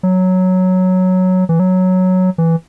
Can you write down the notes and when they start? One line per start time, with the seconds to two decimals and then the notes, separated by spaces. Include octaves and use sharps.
0.03 F#3
1.49 E3
1.60 F#3
2.38 E3